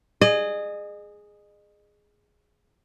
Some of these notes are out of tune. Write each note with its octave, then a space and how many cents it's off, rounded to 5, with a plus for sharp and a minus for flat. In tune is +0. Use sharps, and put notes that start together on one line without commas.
G#4 +0 D#5 -35